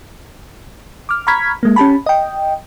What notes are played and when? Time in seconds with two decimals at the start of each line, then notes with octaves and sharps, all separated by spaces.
1.09 D6 F6
1.27 A#5 B5 C#6 F6 G#6 B6
1.63 G#3 A#3
1.76 C#4 G4 A5 B5
2.06 D#5 G5